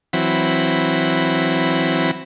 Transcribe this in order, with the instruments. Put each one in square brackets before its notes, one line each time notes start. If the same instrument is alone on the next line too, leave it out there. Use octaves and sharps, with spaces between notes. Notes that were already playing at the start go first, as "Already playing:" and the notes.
[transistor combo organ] E3 F#3 C4 B5